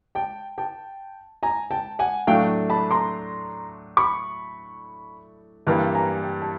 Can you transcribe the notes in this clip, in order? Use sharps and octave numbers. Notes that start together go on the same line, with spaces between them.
G5 A5
G5 A5
G#5 A#5
G5 A5
F#5 G#5
A2 F#3 A3 D4 F5 G5
A5 B5
A#5 C6
B5 C#6
G2 E3 G3 A#3 A5 B5
G#5 A#5
G5 A5
A5